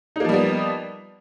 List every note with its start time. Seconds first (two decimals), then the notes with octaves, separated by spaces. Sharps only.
0.16 D#4
0.20 A#3
0.25 F3
0.29 G3
0.33 B3